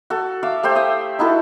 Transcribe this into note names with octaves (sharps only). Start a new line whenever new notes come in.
F#4 A4
E5 F5 D6
A3 G4 C5 G5
E5 D#6
D#4 E4 F#4 A4